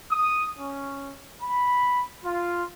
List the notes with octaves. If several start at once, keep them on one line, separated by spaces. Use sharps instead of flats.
D#6
C#4
B5
F4